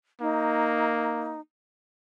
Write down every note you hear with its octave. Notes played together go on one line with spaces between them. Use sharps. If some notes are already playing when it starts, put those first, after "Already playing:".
A#3 D#4